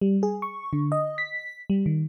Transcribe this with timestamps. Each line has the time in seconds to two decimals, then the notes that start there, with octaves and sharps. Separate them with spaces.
0.01 G3
0.23 G#4
0.42 C#6
0.73 D3
0.92 D#5
1.18 B6
1.70 G3
1.86 D#3